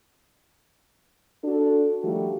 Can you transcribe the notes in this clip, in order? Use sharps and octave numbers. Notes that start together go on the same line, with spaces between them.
D4 F#4 A4
D#3 F3 G3 A3 F#4 G4